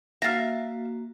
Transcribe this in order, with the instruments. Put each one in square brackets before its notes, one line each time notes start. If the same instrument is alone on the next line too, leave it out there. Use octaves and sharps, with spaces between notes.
[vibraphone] A#3 F#4 [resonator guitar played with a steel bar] E5 F5 [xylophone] F6 A6 A#6